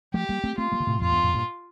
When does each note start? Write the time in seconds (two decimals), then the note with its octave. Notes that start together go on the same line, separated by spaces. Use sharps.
0.14 F3 A3 G4
0.29 G3 A#3
0.44 A3 C4
0.58 A3 C4 F4
0.72 G3 A#3
0.80 D3
0.87 A2 C3
1.01 F2 A2 F4
1.12 E2 G2
1.23 F2 A2
1.34 G2 A#2